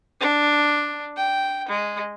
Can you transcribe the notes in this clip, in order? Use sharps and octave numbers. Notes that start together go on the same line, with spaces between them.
D4
G5
G#3